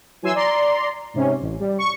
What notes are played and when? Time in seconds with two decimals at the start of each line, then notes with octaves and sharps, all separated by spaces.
0.22 E3 F#3 G#5 C6 E6
0.35 D5 A#5 C6
1.14 G#2 C3 C#4
1.41 A1
1.60 G3
1.78 C#6